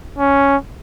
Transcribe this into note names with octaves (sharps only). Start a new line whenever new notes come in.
C#4